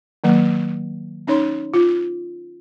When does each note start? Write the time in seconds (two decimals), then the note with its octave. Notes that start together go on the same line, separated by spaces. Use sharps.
0.24 D#3 F#3 A#3 F#5
1.27 C#4 D#4 C#5 C6
1.74 F4